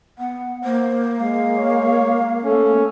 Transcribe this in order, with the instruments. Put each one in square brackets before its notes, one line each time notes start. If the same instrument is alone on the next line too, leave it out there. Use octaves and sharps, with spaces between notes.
[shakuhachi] B3 [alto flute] F#5
[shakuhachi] A#3 [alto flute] C5
[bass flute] G#3 [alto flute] F5
[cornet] C#5
[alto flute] A3 [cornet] C#4 [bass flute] A4